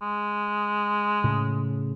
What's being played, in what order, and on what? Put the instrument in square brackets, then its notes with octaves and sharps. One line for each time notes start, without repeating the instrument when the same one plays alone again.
[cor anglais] G#3
[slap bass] A2 C#3